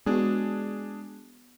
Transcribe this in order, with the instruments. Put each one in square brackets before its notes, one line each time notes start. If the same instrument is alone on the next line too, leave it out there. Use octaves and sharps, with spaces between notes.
[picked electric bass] G#3 [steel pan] B3 F#4 [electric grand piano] D4 G#4